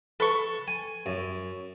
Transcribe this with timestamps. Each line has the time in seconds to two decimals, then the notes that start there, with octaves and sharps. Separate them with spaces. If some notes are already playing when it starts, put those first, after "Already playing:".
0.20 A4 B4 C#6
0.68 G#5
1.06 F#2